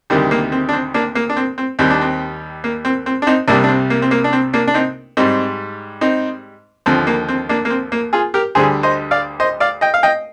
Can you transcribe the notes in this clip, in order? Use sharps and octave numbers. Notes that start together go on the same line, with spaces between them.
D2 C3 D#3 G3 C4
A#3
C4
D4
C4
A#3 D4
A#3
D4
C4
C4
D#2 D#3 G3 C4
D4
C4
A#3
C4
C4
D4
C4 D#4
C2 C3 G3 A#3 D4
D4
C4
A#3
C4
A#3
D4
C4
A#3 D4
D4
C4 D#4
G#2 G3 C4 D#4
C4 D#4
D#2 D3 F3 C4
A#3
C4
A#3 D4
A#3
C4
A#3
F4 G#4
G4 A#4
D2 D3 G3 G#4 C5
C5 D#5
D5 F5
C5 D#5
D5 F5
D#5 G5
F5
D#5 G5